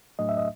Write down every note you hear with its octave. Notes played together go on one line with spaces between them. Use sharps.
A2 F#3 A3 D4 D#5
E5
D#5